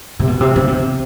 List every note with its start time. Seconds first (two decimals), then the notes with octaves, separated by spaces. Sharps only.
0.19 C3
0.28 B2
0.41 C3
0.56 C#3
0.68 C3